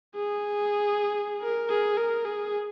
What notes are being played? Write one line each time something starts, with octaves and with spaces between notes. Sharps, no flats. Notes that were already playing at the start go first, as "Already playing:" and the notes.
G#4
A#4
G#4
A#4
G#4